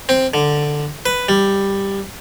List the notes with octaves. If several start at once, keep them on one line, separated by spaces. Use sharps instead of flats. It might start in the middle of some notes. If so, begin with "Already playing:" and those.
C4
D3
B4
G3